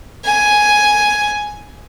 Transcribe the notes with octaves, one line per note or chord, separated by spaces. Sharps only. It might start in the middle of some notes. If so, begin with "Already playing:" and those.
G#5